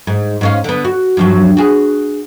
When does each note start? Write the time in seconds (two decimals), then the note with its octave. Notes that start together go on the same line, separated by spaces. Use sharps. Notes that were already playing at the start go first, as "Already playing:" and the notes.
0.07 G#2
0.41 G#2 C#4 F5
0.64 D3 B3
0.85 F#4
1.17 G2 F3 F#3
1.57 F#4 G#4